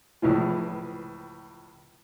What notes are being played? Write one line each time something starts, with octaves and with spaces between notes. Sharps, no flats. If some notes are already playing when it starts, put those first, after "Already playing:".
C#2 A2 E3 F3